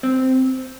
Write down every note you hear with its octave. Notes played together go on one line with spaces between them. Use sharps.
C4